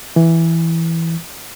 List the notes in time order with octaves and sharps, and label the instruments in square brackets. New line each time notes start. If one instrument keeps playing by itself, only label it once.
[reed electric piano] E3